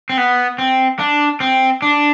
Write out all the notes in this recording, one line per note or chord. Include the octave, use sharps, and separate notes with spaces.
C4
B3
C4
D4
C4
D4